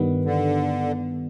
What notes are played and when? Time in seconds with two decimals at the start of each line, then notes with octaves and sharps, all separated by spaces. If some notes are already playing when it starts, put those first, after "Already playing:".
Already playing: G2 D#3 G3 B3
0.25 D3